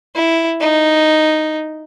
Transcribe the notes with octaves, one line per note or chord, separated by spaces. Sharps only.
E4
D#4